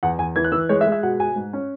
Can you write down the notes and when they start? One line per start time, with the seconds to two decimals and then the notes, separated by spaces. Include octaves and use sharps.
0.03 E2 F#5
0.18 E2 G#5
0.36 E3 G#6
0.44 F#6
0.52 E3 E6
0.69 G#3 C#5
0.81 E5
0.86 G#3
0.92 E5
1.03 B2 F#5
1.20 B2 G#5
1.36 G#2
1.53 C#4